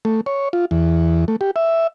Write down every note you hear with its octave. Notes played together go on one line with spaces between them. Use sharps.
A3
C#5
F4
E2
A3
G4
E5